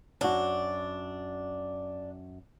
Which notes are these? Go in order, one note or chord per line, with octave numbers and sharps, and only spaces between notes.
F#2 D4 F#4